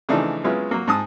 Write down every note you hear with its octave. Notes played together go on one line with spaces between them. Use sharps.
C#3 E3 F3 A3 D4 D#4
F#3 G#3 B3 C#4 E4 F4
F#3 A#3
G#2 A5 D#6